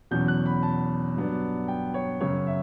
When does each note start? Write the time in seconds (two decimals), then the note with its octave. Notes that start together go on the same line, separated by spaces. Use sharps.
0.11 E2 B2 F#3 C#4 G6
0.28 F#6
0.46 B5
0.63 A5
1.16 G2 F#3 B3 D4
1.68 G5
1.94 C#5
2.20 F#2 C#3 F#3 C#5
2.47 E5